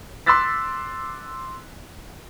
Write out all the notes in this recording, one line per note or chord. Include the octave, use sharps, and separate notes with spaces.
C6 D6 E6 F#6 A6 B6